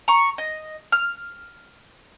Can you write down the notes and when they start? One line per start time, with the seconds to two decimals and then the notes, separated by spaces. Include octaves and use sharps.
0.08 A#5 C#6
0.38 D#5
0.92 F6